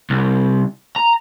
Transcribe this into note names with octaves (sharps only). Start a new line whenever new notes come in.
C2
A#5